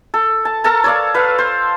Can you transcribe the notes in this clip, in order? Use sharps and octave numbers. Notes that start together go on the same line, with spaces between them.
A4
A5
A4 A#4 A5 A#5
C#5 D5 F5
B4 F5
C5